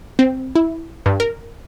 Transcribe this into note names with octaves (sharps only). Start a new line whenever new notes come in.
C4
E4
G2
A#4